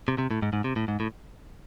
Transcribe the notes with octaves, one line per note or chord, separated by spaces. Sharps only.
C3
C3
A2
G#2
G#2
C3
A2
G#2
A2